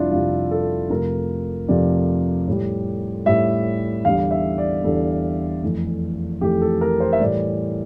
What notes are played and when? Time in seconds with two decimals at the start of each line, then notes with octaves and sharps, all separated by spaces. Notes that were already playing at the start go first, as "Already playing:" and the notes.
Already playing: F2 C3 G3 D4 E4 F4
0.11 F2 C3 G3 F4
0.51 A4
0.90 F2 C3 F3 A3 A#4
1.68 F2 C3 F3 A3 D5
2.47 A2 G3
3.26 A2 G3 E5
4.04 E2 D3 G3 F5
4.31 E5
4.58 D5
4.84 E2 D3 G3 A4
5.63 F2 E3 A3
6.41 F2 E3 A3 G4
6.62 A4
6.81 A#4
7.00 C5
7.13 E5
7.20 A2 E3 G3 D5